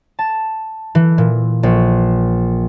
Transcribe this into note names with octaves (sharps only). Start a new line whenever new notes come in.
A5
E3
A#2
A#1